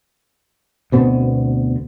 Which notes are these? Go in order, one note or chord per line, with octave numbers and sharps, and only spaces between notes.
D2 B2 B3 C4